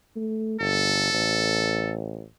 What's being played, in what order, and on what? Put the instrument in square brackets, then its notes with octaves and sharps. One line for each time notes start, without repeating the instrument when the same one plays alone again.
[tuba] A3
[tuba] G1 [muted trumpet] A4
[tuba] A1